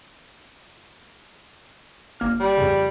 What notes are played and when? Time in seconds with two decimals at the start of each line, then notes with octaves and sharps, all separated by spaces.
2.20 G1 A#3 F6
2.40 G3
2.57 F2 C#3